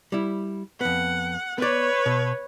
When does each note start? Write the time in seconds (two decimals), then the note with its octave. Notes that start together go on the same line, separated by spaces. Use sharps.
0.12 G3 E4
0.81 F2 B3 F#5
1.58 B3 B4 C#5 D5
2.06 B2